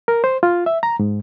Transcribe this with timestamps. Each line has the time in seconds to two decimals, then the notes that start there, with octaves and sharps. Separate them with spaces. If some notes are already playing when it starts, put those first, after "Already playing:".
0.08 A#4
0.24 C5
0.43 F4
0.66 E5
0.83 A#5
0.99 G#2